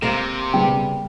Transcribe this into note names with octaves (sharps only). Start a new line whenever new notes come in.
C3 A#3 A#4
C#3 G3 B3 G5